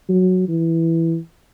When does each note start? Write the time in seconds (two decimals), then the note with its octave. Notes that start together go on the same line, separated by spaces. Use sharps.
0.09 F#3
0.48 E3